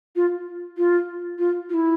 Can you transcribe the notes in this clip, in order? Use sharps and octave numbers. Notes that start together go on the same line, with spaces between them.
F4
F4
F4
F4
E4